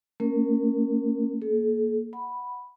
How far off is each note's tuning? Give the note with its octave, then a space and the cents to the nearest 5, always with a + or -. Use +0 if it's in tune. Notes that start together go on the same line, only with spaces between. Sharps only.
A#3 -45 C#4 +0 A#4 +0
A#3 +0 A4 -45
F#5 +0 B5 -5